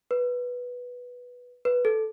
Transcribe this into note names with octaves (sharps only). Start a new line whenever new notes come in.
B4
B4
A4